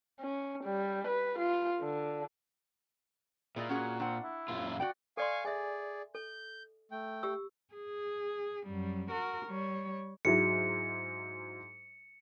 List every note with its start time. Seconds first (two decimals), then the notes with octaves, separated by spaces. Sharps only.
0.21 C#4
0.64 G3
1.08 B4
1.39 F4
1.81 D3
3.56 A#2 E4 G#4 D5 D#5
3.69 C#4 F#4 G#4 F#5
4.00 C4 D4 F#5
4.23 E4
4.48 F#2 A#2 F4
4.80 F#4 D5 G5
5.17 A4 D5 F5 G#5 C6 C#6
5.45 G#4 D5 E5 G#5
6.15 A4 G6
6.91 A3 G5
7.23 G4 E6
7.74 G#4
8.66 F#2 G3
9.11 F#4 A#4
9.46 G3 C#5
10.25 G#2 F#3 E4 C#7